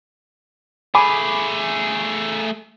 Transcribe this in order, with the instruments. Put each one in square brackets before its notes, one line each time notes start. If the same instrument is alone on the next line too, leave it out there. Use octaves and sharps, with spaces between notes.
[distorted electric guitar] A3 G#4 [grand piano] G#5 B5 D6